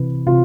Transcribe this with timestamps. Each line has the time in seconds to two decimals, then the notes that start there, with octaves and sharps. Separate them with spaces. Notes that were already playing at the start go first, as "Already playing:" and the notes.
Already playing: C3 E3 B4
0.26 C3 F4